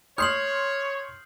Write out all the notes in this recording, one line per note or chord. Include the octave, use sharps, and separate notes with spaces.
C#5 C6 D#6 F6 G6 C7 F#7